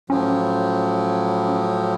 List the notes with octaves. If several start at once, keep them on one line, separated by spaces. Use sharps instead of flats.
A2 F3 F#3 C#4